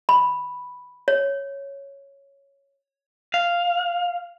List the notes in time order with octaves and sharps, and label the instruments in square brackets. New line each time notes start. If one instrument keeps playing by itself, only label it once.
[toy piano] B5
C#5
[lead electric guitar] F5